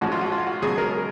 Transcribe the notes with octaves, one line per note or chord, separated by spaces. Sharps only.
A#1 G#2 F3 G#3 C#4 F#4
F4
F#4
F4
F#4
C#2 B2 F#3 G#4
A#4